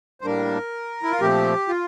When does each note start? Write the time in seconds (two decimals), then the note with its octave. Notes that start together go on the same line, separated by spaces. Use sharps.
0.21 C5
0.24 A2 G3 A#3 D4 A#4
1.03 E4
1.12 F4
1.20 A#2 F3 A3 C4 G4
1.68 F4